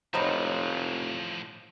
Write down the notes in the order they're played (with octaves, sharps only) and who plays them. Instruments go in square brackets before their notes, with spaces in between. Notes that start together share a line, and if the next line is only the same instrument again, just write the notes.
[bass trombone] F1 [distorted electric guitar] A2 F3 [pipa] F#3 B3 D#4 [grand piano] C5 C#5